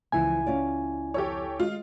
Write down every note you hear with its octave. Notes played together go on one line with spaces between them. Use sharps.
C#2 E3 F3 B3 E4 G#5
C#4 F4 D5
F2 G4 A4 C#5
G#3 F4